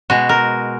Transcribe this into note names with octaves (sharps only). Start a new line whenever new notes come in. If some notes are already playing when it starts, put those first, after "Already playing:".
B2 G#3 F#4
A#4